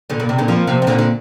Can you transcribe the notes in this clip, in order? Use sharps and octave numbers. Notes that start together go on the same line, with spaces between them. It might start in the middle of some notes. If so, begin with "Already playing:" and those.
A#2 D3
A#2
C3
A#2 D3
F3 A#3
C3 F3
C3
A#2 D3
D3